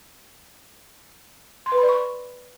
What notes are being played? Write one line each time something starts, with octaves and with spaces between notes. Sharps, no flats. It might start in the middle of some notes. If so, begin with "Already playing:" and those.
C6
B4
B5
D5
C#6